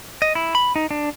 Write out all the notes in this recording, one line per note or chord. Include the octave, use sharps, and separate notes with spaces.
D#5
E4
B5
D#4
D4